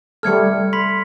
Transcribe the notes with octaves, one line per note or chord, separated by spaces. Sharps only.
G3 A3 A4 F6 G#6 C#7
B5 C6 B6